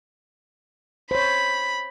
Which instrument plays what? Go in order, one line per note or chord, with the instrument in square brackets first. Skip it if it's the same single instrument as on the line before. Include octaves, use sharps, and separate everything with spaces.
[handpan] C5 C#5 [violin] B5